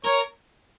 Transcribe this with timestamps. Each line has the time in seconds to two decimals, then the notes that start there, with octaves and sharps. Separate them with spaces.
0.04 A#4 C#5